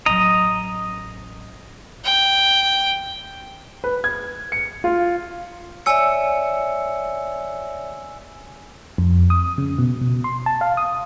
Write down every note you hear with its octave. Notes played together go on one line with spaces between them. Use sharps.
A1 F#3 D#5 A#5
G5
B4
G#6
C#7
F4
C#5 D5 E5 G#5 E6 C#7
F2
D#6
C#3
B2
B2
C6
A5
F5
D#6